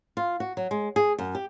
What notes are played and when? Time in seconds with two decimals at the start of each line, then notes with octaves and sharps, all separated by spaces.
0.17 F4
0.40 F#4
0.57 F#3
0.71 G#3
0.96 G#4
1.19 F#2
1.35 G4